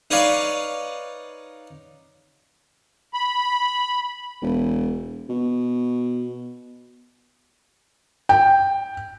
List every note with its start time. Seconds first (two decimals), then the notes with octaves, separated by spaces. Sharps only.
0.11 D#4 B4 C#5 D5 F5
3.13 B5
4.42 E1
5.29 B2
8.29 G5